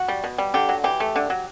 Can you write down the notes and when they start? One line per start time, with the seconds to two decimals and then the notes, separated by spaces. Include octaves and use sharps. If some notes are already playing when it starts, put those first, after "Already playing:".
Already playing: F#4
0.08 G3
0.24 B2
0.38 G3
0.54 D3 G4
0.69 F#3
0.84 E3 G4
1.00 A3
1.16 D3
1.30 F#3